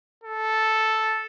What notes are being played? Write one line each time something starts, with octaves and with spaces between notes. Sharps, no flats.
A4